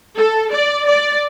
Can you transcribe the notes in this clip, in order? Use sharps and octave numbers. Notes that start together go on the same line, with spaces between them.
A4
D5
D5